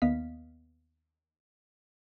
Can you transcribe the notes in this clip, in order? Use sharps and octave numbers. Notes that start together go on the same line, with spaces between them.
D#2 B3 D#5 F5 B6